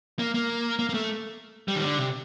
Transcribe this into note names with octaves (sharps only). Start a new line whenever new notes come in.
A#3
A#3
A#3
A#3
A3
G3
D#3
D3
C3